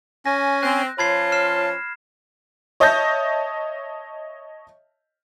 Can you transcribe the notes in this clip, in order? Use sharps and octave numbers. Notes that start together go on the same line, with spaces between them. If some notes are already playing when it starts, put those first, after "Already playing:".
C#4 G#5 A#6
C4 F#6
F3 C#4 F4 C#5 A5 B5 G#6 C7
F6 C7 E7
C#5 D#5 E5 A5 G6 A#6